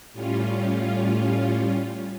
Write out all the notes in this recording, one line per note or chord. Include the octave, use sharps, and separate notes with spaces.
A2 G3 C#4 F4